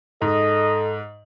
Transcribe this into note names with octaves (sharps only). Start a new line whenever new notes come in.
G#2 A4 D#5